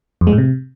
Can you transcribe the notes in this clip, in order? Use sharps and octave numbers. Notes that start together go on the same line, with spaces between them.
F2
G#3
A2
C3